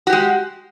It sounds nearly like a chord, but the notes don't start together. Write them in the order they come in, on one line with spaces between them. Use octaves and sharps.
F#4 G4 G#3